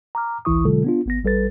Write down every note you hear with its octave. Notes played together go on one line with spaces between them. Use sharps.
A#5 D6 F6
A1 D2 E3 E4 C#6 D#6
B2 D3 F#3 G#3 F4 A4
B3 D4 F4
G#1 B3 A#6
A1 G3 A4 B4 A6